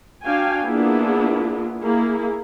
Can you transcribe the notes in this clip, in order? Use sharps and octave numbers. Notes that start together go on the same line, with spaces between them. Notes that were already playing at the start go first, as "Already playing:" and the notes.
D4 F#4 F5 G5 G#5
A#3 B3 D4 E4 F4 G#4
A#3 E4 G#4